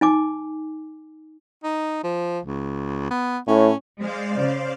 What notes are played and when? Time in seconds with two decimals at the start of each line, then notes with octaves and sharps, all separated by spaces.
0.01 D#4 G#5 D6
1.63 D#4
2.04 F3
2.45 C#2
3.11 B3
3.47 A2 C#4
3.98 G#3 C5 D5 F5
4.38 C#3